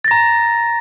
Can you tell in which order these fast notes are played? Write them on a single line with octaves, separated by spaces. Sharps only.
A6 A#6 A#5